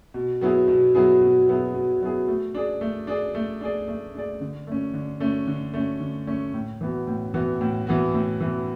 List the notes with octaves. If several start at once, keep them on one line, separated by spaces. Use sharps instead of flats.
B2
F#3 B3 E4 G#4
B2
F#3 B3 E4 G#4
B2
F#3 B3 E4 G#4
B2
F#3 B3 E4 G#4
A3
D4 G#4 D5
A3
D4 G#4 D5
A3
D4 G#4 D5
A3
D4 G#4 D5
D3
A3 C#4
D3
A3 C#4
D3
A3 C#4
D3
A3 C#4
A2
E3 B3 F#4
A2
E3 B3 F#4
A2
E3 B3 F#4
A2
E3 B3 F#4